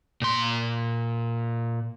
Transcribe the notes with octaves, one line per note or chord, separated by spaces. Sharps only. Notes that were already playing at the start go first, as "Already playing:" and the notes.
A#2 C6